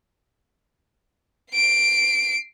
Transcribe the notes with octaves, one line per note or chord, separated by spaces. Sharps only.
C7 D7